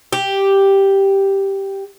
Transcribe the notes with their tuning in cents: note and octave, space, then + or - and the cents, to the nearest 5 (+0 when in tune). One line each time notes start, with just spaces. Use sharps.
G4 +0